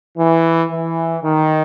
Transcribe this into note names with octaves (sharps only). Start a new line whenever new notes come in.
E3
E3
D#3